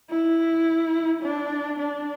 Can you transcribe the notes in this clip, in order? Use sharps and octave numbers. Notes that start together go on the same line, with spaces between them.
E4
D4
D4